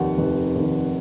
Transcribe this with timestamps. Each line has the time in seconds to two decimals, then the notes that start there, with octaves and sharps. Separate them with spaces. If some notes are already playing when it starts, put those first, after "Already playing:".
Already playing: F1 D#2 D#3 F#5
0.18 F1
0.55 D#2 D#3